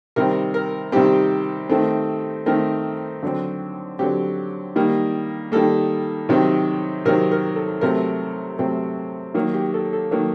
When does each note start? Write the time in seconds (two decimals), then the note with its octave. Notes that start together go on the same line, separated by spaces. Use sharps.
0.16 C3 D#3 G3 C4 A#4
0.54 A#4
0.92 C3 D#3 G3 C4 G4
1.69 D#3 A3 C4
2.46 D#3 A3 C4 A#4
3.23 D3 F#3 C4
3.99 D3 F#3 C4 G4
4.76 D#3 G3 A#3
5.52 D#3 G3 A#3 A4
6.29 C3 D#3 F#3 C4
7.05 C3 D#3 F#3 C4 A#4
7.31 A#4
7.56 A4
7.81 C3 F#3 A3 C4 A#4
8.59 C3 F#3 A3 C4
9.34 D#3 F#3 A#3
9.54 G4
9.74 A4
9.93 A4
10.11 D#3 F#3 A#3